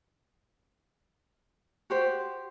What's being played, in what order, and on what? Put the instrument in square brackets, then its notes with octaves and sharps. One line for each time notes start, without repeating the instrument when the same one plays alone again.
[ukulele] F#4 G4 C5